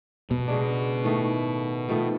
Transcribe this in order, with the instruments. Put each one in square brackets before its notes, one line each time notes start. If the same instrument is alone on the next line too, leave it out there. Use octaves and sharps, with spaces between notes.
[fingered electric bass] B2
[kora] C#3 G#3 D4
A2 D#3 A3
D#3 F3 A3